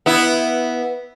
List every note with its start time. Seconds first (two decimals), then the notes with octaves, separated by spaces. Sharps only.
0.06 B3 E4